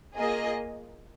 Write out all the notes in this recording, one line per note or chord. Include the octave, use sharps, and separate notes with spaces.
A#3 F4 G#4 D#5